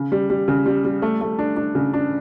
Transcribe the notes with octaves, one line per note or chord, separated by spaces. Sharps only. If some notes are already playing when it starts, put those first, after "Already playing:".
Already playing: C#3
G3
G3
C#3
G3
G3
A3
A3
D4
D4
C#3
D4